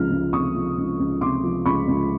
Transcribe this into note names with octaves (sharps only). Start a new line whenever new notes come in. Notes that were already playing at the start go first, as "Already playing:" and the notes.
Already playing: C#2 C3 F3 F6
C#2
C3 C#6 D#6
F3
C#2
C#2
C3 C6 D6
F3
C#2 B5 C#6
C#2